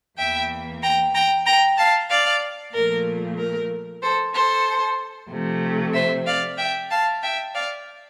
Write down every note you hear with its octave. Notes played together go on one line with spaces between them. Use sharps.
E2 E3 A#3 E5 G5
G5 A#5
G5 A#5
G5 A#5
F5 A5
D5 F5
A#2 F3 A3 A#4
A#4
A4 C5
A4 C5
C3 F3 A3
C5 E5
D5 F5
E5 G5
F5 A5
E5 G5
D5 F5